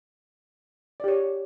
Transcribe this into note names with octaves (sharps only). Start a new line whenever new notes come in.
G4 C#5 D5